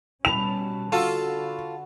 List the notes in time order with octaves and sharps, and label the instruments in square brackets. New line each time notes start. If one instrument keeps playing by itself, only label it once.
[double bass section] B2 G3 C#4 [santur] B4 A5 [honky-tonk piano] F7
[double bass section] D3 [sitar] F4 A4 [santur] F#4